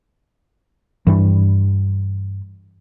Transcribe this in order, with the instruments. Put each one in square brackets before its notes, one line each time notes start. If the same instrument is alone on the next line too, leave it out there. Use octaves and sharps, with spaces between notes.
[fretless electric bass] G2 E3 G3